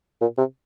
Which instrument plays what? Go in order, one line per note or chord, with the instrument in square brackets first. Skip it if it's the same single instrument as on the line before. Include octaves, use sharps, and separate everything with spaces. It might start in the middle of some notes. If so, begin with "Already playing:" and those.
[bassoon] A#2
C3